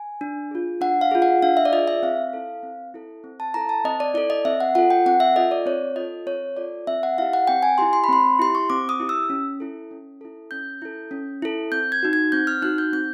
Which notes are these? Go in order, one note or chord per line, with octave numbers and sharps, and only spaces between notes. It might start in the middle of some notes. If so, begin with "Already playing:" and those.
Already playing: G#5
D4
F4 G#4
D4 F#5
F5
F4 G#4
F#5
D4 F5
E5
D5
F4 G#4 D#5
E5
C4 F5
E4 A4
C4
E4 A4
C4
A5
E4 A4 A#5
A5
C4 D#5
D5
E4 A4 D5
D#5
C4 E5
F#5
F4 A4 F#5
G5
C4 F#5
E5
F4 A4 D#5
D5
C4 C#5
F4 A4 D#5
C4 C#5
F4 A4 D5
C4 E5
F#5
E4 G4 F5
F#5
C4 G5
G#5
E4 G4 C6
C6
B5
C4 C6
E4 G4 C6
C#6
C4 D6
D#6
E4 G4
E6
C#4
E4 A4
C#4
E4 A4
C#4 G6
E4 A4
C#4
E4 A4
C4 G6
G#6
D#4 F#4
G#6
C4 G6
F6
D#4 F#4 F#6
G6
C4 G6